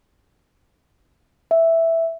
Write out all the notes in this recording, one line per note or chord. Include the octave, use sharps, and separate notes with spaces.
E5